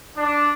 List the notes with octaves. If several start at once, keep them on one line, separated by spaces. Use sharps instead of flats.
D4